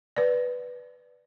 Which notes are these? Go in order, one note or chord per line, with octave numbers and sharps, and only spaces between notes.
B4 D5